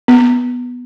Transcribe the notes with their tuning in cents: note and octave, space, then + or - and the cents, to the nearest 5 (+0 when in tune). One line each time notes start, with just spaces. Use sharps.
B3 +0